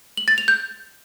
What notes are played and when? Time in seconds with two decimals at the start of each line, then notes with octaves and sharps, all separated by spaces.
0.17 F#7
0.28 A6
0.38 F7
0.48 G6